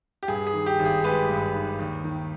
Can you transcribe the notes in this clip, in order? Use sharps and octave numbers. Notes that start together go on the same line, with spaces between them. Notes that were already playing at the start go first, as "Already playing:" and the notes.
G4
G2 G#4
G#4
D#3
G4
G#1
G#4
G#3 G4 B4
G2
D#3
D#2
D#3